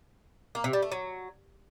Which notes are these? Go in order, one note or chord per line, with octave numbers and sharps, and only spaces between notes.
A#3
C3
G3
A3
F#3